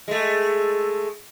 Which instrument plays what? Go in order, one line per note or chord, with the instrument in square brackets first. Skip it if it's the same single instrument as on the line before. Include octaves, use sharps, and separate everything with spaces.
[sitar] G#3 A3